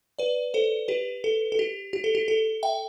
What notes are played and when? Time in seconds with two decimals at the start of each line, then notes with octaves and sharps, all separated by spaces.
0.19 B4 D5
0.54 A4 C5
0.88 G4 B4
1.24 A4
1.52 A4
1.59 G4
1.93 G4
2.04 A4
2.15 G4
2.28 A4
2.63 E5 G5